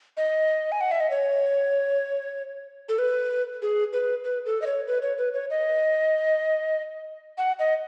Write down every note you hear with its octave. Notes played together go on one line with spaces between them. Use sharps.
D#5
G#5
F#5
E5
D#5
C#5
A4
B4
G#4
B4
B4
A4
D#5
C#5
B4
C#5
B4
C#5
D#5
F#5
D#5